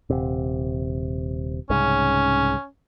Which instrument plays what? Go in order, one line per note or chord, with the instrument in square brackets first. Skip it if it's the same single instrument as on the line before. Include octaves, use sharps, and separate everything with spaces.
[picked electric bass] D#1 C3
[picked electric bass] C2 G#2 C#3 [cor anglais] C#4